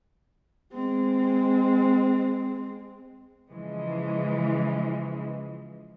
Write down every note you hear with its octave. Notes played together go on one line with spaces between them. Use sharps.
G#3 C4
C#3 E3 F3 G#3